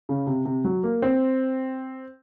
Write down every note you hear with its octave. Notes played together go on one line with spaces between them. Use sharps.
C#3
C3
C3
F#3
A#3
C4